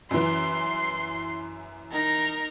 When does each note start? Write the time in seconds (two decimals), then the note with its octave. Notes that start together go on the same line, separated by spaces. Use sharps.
0.11 F#2 E3 C6
1.91 D#4 A#4